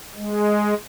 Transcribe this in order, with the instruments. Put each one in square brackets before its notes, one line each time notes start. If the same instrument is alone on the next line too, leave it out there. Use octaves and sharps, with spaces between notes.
[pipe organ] G#3